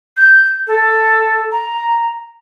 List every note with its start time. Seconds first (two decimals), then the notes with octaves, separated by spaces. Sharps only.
0.17 G6
0.67 A4
1.52 A#5